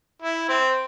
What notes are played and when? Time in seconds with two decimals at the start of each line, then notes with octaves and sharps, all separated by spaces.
0.22 E4
0.49 C4